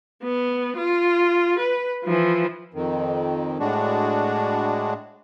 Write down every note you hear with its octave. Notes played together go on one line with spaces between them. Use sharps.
B3
F4
B4
E3 F3
F2 D#3
A2 G#3 D4 F#4